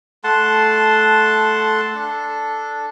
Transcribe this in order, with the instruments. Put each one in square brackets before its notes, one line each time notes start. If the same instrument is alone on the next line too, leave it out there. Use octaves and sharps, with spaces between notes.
[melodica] A3 F#5 A5 C6
D4 A4